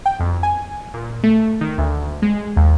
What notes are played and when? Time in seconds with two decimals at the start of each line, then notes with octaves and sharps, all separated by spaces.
0.06 G5
0.20 F2
0.43 G#5
0.94 A#2
1.23 A3
1.61 D#3
1.78 D2
2.22 G#3
2.57 D#2